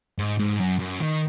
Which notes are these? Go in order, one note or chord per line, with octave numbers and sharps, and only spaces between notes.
G#2
G#2
F#2
F#2
D#3